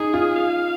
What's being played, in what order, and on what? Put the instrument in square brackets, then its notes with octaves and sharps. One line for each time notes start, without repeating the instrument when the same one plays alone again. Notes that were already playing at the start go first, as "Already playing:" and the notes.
Already playing: [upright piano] D#4 [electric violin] G#4
[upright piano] F4
[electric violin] F5